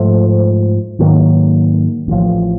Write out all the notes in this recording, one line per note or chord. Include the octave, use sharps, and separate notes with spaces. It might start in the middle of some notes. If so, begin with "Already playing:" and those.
Already playing: G#2 F3 A3
G#2 D#3 F#3 A#3
A1 A2 F3